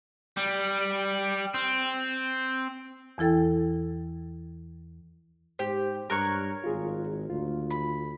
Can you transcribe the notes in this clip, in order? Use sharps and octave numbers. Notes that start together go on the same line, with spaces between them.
G3
C4
E2 E3 E4 A4 G5
G#2 G4 C5
G2 A#4 C#5 A#5 C#6 F#6 G#6
G#1 F4 G#4
D2 F4
B5